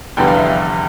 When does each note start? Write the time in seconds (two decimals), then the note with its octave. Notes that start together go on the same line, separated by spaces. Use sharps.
0.17 F1 E2 D3 G3 B3 G5
0.28 F5
0.37 E5
0.46 F5